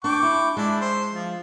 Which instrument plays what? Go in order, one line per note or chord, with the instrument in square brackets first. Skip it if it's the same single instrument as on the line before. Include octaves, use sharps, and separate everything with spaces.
[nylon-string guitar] D4 [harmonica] G5 C#6 D6
[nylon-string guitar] E4
[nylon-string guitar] G#3 [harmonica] D4 E4
[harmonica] C5
F3